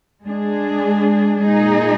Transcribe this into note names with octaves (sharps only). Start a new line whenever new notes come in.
G#3 D4 G#4
A#2 G#3 D#4 G#4